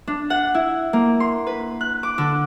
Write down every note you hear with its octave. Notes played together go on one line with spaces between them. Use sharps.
D4
F#5
E4
A#3
C6
B4
F#6
D6
D3